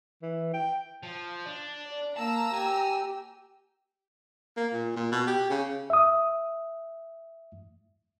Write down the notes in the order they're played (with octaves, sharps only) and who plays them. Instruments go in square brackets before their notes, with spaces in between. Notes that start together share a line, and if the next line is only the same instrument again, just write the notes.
[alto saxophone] E3
G5
[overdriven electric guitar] F3
D4
[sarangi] D5
[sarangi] A#3 [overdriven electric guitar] A5 [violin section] A#5 E6
[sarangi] G4 [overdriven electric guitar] G#5
[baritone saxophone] A#3
A#2
A#2
B2
G4
C#3
[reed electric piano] E5 D#6